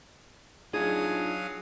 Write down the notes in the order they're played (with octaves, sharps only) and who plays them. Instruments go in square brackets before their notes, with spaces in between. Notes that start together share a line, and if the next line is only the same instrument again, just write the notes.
[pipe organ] F#3 F5 D#6 [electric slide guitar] D4 D#4 F4 [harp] G#4